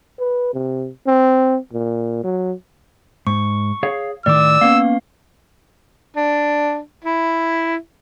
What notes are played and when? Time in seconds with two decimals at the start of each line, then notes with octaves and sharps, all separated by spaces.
0.19 B4
0.54 C3
1.07 C4
1.73 A#2
2.24 F#3
3.27 G#2 C#6
3.83 G#4 C#5 F5
4.26 A2 D#3 D5 D6 E6
4.61 A#3 B3 C#4 F5
6.16 D4
7.04 E4